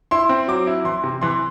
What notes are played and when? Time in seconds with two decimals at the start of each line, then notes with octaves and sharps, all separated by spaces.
0.11 E4 C6
0.29 C4
0.48 F#3 D6
0.67 E4
0.85 E3 C6
1.04 C3
1.21 E3 C6